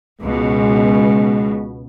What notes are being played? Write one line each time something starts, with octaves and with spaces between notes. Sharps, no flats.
C#2 B2 G#3